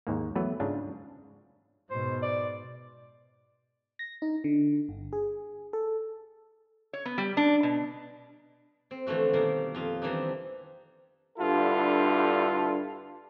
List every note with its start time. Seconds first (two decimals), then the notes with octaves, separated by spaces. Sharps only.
0.07 D#2 G#2 A#3
0.35 E3 F#3 A3 B3 B4
0.60 G#2 C#3 D4 F4
1.90 G#2 B2 C5
2.23 D5
3.99 A#6
4.22 D#4
4.44 D3
4.89 G1
5.13 G#4
5.73 A4
6.93 C#5
7.05 B3
7.18 G3
7.37 D4
7.63 B2
8.91 C4
9.07 D3 E3 F3 A3 F#4
9.33 B2 D#3 G3 A#3
9.75 F2 F4 D#5
10.02 D#3 E3 G3 C4 D4 D#4
11.38 G2 D3 E4 F4 A4